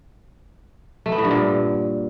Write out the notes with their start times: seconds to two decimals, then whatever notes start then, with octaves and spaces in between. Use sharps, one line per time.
1.06 A3
1.12 B3
1.18 A2
1.24 G2
1.31 A#2